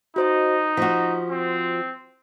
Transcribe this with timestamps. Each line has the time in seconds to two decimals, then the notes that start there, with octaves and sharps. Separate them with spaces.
0.16 D#4 F#4 C5 D#5
0.77 F3 F#4 B6
1.30 C4